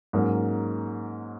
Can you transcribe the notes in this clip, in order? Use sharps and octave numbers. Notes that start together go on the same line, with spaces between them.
G#2 F#3 A#3 C#4